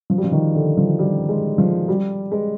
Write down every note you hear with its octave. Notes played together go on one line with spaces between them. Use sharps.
F3
G3
F3
D#3
D3
F3
G3
G#3
F3
G3
G#3